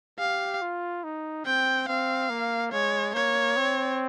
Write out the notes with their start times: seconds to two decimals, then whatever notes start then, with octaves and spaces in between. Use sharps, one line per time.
0.19 G4 F5
0.62 F4
1.04 D#4
1.45 C4 G5
1.88 C4 F5
2.30 A#3
2.72 G#3 C#5
3.14 A#3 C#5
3.57 C4